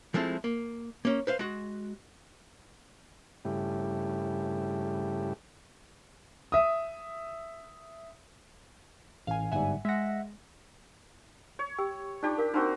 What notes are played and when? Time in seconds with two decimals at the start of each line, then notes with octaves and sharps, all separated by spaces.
0.14 F3 G#3 A3 C4 E4
0.44 A#3
1.05 A#3 C#4
1.27 B4 C5 F5
1.39 G#3 F#4
3.45 G2 C#3 A3 E4 G4
6.52 E5 D#6
9.27 A1 F5 G#5
9.52 G1 G#2 G3 E5 F#5 G#5
9.85 G#3 E5 F#5 A#6
11.59 C#5
11.78 G4 G5 E6
12.23 D4 D#4 F4 G4
12.38 A#4 F5
12.54 A#3 C4 D4 D#4 F#4